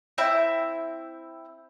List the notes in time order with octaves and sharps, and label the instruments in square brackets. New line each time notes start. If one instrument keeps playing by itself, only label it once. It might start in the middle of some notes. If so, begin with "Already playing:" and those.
[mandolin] C4 E4 E5 G5